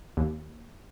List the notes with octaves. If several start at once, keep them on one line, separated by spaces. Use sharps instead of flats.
D#2